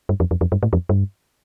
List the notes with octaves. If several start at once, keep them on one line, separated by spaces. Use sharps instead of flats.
G2
F2
F2
F2
G2
A2
F2
G2